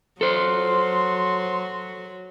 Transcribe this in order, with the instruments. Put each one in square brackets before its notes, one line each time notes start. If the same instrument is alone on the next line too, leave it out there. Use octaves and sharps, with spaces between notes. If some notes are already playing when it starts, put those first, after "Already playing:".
[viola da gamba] F#3 [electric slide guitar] A4 C5 [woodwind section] C6